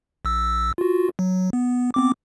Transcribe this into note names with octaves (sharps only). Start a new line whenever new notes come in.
A#1 E6
F4 F#4
F#3
B3
B3 C4 D6